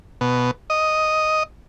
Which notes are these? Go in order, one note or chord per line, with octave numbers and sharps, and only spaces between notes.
B2
D#5